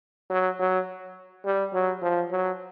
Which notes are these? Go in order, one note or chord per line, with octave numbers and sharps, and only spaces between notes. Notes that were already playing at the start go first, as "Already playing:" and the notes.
F#3
F#3
G3
F#3
F3
F#3